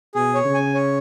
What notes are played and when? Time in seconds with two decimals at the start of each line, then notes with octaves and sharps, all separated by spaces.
0.15 B2 G#4
0.35 C#5
0.45 C#3
0.54 G#5
0.75 C#5